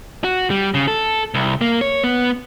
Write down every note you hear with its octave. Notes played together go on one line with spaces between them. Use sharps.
F#4
G3
C#3
A4
C2
A#3
C#5
B3